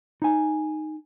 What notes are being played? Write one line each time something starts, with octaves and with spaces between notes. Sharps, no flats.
D#4 G#5